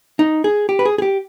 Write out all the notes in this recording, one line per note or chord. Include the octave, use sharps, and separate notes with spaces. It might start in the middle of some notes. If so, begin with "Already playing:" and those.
D#4
G#4
G4
B4
G#4
G#4
G4